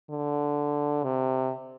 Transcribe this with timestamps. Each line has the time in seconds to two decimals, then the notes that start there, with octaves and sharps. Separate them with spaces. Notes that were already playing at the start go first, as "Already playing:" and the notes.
0.10 D3
1.04 C3